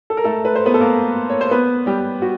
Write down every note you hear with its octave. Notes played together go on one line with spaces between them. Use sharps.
A4
A#4
A3 A4
B4
C5
B3 B4
A4
A#3 A#4
C#5
C5
B3 B4
G3 G4
F#4